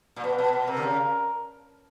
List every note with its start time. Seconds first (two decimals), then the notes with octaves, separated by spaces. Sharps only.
0.16 A#2
0.24 B2 B4
0.38 B2
0.53 B2
0.67 C3 A#4
0.77 D3
0.82 C#3